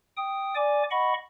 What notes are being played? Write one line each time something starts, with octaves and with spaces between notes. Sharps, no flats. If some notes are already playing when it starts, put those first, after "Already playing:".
G5 D#6
D5 G#5 D6
D#5 F#5 B5 C#6